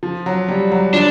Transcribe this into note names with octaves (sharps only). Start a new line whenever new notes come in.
F3
F#3
G3
F#3
F3 D4